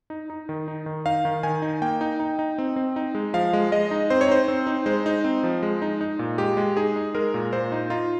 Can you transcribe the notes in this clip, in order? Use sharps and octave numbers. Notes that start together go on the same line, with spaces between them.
D#4
D#4
D#3
D#4
D#3
D#4 F5
D#3
D#3 G#5
D#4
A#3 G5
D#4
D#4
D#4
C4
C4
D#4
G#3
F3 F5
G#3
G#3 D#5
D#4
C4 C5
C#5
D#4 C5
C4
D#4
G#3 C5
D#4
C4
F3
G#3
D#4
D#4
A#2
G#3 G4
G#3
D#4 G#4
D#4
G#3 A#4
A#2
A#2 C5
D#4
D#4 F4